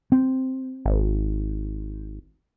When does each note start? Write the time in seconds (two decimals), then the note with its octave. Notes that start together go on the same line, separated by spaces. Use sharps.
0.12 C4
0.86 G#1